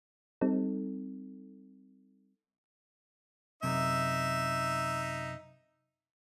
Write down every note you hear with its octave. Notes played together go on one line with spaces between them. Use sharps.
G3 C4 D#4 A4
F#2 C3 D#4 E5